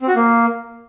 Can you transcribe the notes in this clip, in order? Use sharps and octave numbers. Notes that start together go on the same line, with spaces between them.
C4
F#4
A#3